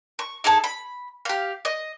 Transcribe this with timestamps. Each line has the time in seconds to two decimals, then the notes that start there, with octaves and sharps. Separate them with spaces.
0.19 C#6
0.44 D#4 G#4 A4 A5
0.64 B5
1.25 G4 F5
1.65 D#5